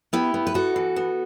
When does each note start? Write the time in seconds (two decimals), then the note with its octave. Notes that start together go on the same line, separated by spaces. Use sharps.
0.13 B3 E4 G4
0.34 B3
0.47 B4
0.54 B3 F#4 A4
0.76 E3
0.96 B3